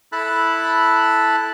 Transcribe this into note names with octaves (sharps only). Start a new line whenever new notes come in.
E4 A4 A5 B5 F#6